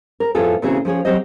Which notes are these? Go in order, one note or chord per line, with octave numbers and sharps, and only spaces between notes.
A#4
F2 A2 B3 F4 G#4 A4
A#2 C#3 E3 C4 F#4 G#4
F3 C#4 G#4 C#5
F#3 C4 G4 C5 D#5